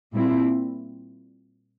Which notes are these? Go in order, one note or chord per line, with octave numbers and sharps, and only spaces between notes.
A#2 G3 C4 E4